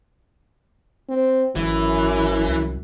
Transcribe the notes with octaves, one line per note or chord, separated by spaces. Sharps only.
C4
G#1 F#2 E3
C2